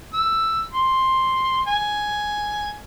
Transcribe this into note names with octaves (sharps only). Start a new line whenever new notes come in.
E6
C6
G#5